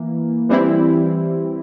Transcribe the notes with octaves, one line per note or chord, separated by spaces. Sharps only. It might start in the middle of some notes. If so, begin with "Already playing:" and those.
Already playing: E3 A#3
E3 G3 C4 E4